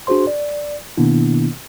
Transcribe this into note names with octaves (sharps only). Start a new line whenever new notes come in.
D4 F#4 G#4 C5 C6
D5
B2 D#3 A#3 B3 D4 E4